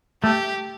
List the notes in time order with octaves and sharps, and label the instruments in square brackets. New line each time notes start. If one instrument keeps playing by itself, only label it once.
[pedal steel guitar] A3 [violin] G4